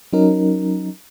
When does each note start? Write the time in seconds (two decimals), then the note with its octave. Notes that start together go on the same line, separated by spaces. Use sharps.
0.13 F#3 C#4 D#4 A#4